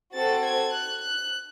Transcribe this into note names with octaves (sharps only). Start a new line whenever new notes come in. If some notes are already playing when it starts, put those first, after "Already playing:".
C4 F#4 A4 A6
G#6
F#6
F#6